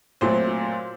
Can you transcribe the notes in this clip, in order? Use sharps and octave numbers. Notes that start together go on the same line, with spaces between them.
A#2 F#3 A3 C4 C5